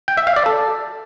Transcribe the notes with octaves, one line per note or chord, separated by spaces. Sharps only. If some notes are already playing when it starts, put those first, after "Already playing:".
G5
E5
F5
D5
A4